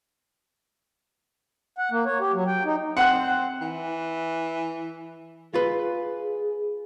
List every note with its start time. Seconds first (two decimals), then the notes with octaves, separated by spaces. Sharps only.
1.78 F#5
1.91 A#3
2.06 C#5
2.20 G4
2.33 F#3
2.47 G5
2.65 D#4
2.97 C4 F#5 F#6
3.61 E3
5.54 F4 G#4 B4